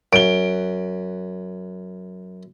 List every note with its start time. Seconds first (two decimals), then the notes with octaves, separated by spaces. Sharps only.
0.13 F#2 D7 G7